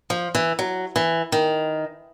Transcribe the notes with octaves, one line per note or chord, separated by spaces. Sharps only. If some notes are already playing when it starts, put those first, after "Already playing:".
F3
E3
F#3
E3
D#3